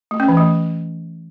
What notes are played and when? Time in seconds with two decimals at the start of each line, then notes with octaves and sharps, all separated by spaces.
0.11 A3
0.20 C#4
0.28 E3
0.37 A3